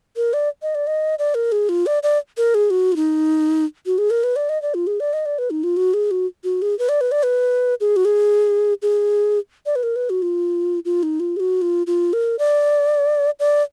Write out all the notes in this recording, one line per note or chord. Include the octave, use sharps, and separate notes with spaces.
A#4
D5
D#5
D5
D#5
D5
A#4
G#4
F4
D5
D5
A#4
G#4
F#4
F4
D#4
F#4
G#4
A#4
B4
D5
D#5
D5
F4
G#4
D5
D#5
D5
B4
D#4
F4
F#4
G#4
F#4
F#4
G#4
B4
D5
B4
D5
B4
G#4
F#4
G#4
G#4
D5
B4
A#4
B4
F#4
F4
F4
D#4
F4
G#4
F#4
F4
F4
A#4
D5
D5